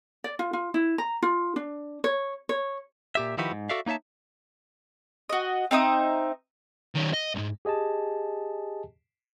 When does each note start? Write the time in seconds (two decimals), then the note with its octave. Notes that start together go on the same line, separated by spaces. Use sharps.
0.24 D5
0.39 F4
0.53 F4
0.74 E4
0.98 A#5
1.22 F4
1.56 D4
2.04 C#5
2.49 C#5
3.15 A#2 G4 E5
3.38 D#3 F3 E4 F#4 G4 B4
3.52 G#2
3.69 F#4 A4 D5 E5 F5
3.86 A#3 D#4 C#5 E5 A5
5.29 F#4 D#5
5.71 C4 D#4 E5 D#6
6.95 D#3 C#4
7.14 D#5
7.35 B1 G#2
7.65 G4 G#4 D#5 G#5 A5